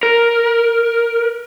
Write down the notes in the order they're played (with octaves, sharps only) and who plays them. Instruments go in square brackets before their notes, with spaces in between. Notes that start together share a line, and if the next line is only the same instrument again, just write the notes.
[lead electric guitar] A#4